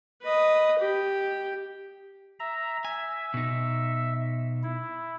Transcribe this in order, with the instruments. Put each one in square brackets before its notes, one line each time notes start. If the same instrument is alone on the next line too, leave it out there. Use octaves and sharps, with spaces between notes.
[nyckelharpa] B4 D#5
G4
[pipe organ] E5 A#5
[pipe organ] E5 [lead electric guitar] G#5
[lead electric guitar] B2 D#4
[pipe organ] E4